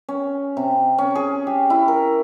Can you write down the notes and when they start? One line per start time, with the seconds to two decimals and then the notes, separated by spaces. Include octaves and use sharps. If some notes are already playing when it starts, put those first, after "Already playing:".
0.09 C#4
0.57 C3
0.98 C#4
1.15 G#4
1.47 G4
1.70 E4
1.88 A#4